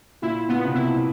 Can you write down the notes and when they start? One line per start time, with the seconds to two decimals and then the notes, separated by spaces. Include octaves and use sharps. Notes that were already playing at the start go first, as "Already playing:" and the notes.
0.22 A#2 E4
0.49 A#2 B3
0.65 C3
0.74 B2 E4